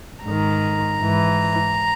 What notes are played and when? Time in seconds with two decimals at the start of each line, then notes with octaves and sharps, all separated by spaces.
0.24 G#2 D#3 A#5
0.98 G#2 E3